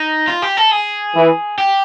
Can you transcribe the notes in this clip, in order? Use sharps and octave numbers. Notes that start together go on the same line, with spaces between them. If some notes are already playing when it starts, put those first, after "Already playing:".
Already playing: D#4
F4
G4
A4
G#4
E3
G4